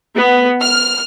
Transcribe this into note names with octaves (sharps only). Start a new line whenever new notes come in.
B3
F6